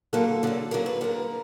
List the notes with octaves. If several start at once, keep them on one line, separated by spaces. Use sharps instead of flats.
D3 F#3 A#3 A4
D3 F#3 A#3
D3 F#3 A#3 A#4
B4
D3 F#3 A#3 A#4